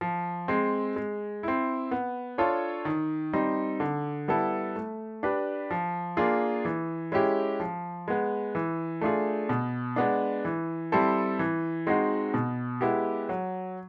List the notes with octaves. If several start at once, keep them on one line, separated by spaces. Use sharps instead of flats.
F3
G#3 C4
G#3
C4 E4
B3
D4 F4 A4 C#5
D#3
G3 C4 D#4
D3
G3 B3 E4 A4
A3
D4 G4 B4
F3
A#3 D4 F4 G#4
E3
G#3 C#4 E4 G4
F3
G#3 B3
E3
A3 D4 F4 G#4
B2
G#3 B3 D4
E3
G3 C4 E4 A4
E3
G#3 C4 D#4 F#4
B2
G#3 B3 E4 G4
F#3